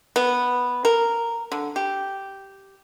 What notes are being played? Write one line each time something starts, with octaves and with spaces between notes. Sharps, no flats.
B3
A#4
D3
G4